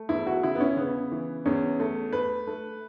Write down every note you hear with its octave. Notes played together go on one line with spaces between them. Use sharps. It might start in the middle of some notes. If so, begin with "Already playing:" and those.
Already playing: A3
E2 E4
F#4
C#3 E4
B3
C#4
C#3 B3
E3
E2 C#4
A3
A3 B4
A3